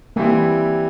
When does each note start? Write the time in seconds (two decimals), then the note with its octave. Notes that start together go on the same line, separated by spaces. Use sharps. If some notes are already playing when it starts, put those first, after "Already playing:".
0.16 E3 G3 A#3 C4 E4